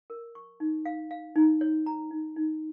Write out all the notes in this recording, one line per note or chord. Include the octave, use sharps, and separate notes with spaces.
A#4
C#6
D#4
F5
F5
D#4
C#5
A#5
D#4
D#4